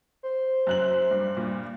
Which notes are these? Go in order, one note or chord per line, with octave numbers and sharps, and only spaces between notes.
C5
F#2 F#6 F#7
G2
G2 A#2